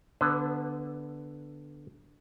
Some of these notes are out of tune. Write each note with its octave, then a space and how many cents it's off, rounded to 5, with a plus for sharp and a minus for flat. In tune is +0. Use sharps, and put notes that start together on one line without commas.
D3 +0 B3 +0 B4 +45